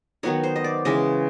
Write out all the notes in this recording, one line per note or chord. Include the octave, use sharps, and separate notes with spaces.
D#3 F#3 B3 D#4 C#5
C5
D#5
D5
C#3 E3 G#3 D#5